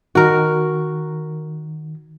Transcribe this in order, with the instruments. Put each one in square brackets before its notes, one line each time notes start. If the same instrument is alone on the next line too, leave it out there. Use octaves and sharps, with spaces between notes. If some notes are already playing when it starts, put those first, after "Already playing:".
[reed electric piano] D#3 [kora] F#4 A#4